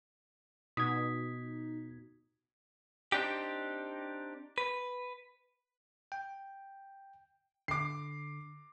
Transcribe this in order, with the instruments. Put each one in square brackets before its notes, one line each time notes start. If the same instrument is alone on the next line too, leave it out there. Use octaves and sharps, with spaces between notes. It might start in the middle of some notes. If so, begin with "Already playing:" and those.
[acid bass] B2 [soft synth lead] D#4 [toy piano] D#6 [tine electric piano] G#6 B6
[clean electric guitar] C4 D4 D#4 G4
B4
[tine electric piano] G5
[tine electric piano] D3 [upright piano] D6 C7